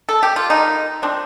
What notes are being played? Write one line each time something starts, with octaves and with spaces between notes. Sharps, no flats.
A4
G4
F4
D3 G3 A#3 D#4
F3 C4 D4